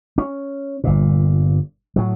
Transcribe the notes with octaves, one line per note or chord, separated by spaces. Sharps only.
C#4
G1 A#2
A2 F#3